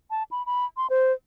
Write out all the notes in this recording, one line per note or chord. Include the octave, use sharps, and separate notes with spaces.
A5
B5
B5
C6
C5